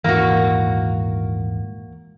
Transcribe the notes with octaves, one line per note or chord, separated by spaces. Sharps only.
D#1 G#2 E3 A#3 F#4